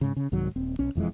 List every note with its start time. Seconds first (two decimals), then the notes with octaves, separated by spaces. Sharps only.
0.01 G#2 C#3
0.16 C#3
0.32 C2 G#2 D#3 F#3
0.56 D#1 C4
0.79 B1 C#4
0.95 E1 F2 E3 G#3